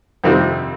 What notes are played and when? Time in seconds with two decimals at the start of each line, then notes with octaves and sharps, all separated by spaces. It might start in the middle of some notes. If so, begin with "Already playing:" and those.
0.24 F2 C3 D#3 G3 C4